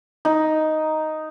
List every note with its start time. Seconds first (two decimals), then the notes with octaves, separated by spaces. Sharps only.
0.25 D#4